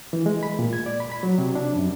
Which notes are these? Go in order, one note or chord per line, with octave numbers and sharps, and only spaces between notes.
E3
G#3
B5
A#2
G#6
D5
B5
B5
F#3
C3
D4
F#2